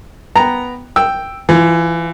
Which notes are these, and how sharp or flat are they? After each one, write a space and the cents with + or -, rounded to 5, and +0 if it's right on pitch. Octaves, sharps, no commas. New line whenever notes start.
B3 +0 G5 +5 A#5 +0
G5 +0 E6 +0
E3 +25 F4 +0